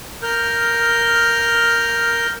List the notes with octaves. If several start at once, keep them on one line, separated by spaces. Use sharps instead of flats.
A#4 F6 G6